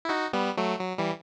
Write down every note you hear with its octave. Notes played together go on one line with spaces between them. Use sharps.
E4
D#4 F#4
G3 B3
F#3 A3
F#3
E3 G3